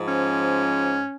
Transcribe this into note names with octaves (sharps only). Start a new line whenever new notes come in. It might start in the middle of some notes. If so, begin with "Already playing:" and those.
Already playing: G#2 F3
C#4